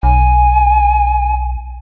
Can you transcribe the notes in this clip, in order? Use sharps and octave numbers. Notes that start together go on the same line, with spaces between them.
B1 G#5